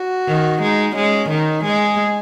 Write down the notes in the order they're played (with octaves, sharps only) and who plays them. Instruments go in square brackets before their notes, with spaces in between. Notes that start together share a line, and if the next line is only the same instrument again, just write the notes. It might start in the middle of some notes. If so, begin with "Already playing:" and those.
Already playing: [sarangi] F#4
[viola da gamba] D#3
[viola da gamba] G#3 [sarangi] D#4
[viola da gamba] G#3 [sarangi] C#4
[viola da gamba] D#3 [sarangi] D#4
[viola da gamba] G#3 [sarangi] G#4